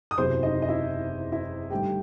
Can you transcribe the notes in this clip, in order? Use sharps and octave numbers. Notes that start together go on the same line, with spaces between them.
D#6
F#1 E2 C3 F#3 C5 C6
D#4 D#5
D#5
E4 E5
E4 E5
G1 G2 D#3 A3 G4 G5